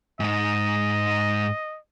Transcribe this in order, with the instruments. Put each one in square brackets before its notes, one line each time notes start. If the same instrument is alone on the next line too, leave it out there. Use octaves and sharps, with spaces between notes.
[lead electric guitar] G#2 D#4 [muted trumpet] D#5